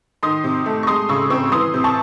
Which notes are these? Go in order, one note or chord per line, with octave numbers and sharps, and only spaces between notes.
D#3 C6 D#6
C3
A3
C#6
G#3 C6 D#6
C#3 C#6 E6
C4 C#6 E6
E6
E3 C6 D#6
C3
A5 C#6